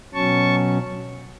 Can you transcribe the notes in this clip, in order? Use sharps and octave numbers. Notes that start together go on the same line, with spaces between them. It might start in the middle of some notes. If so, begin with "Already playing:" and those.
B2 F#3 C#4 A5 C#6